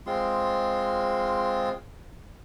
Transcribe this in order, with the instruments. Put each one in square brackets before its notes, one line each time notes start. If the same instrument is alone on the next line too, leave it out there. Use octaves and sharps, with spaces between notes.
[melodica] G#3 C4 F4 C6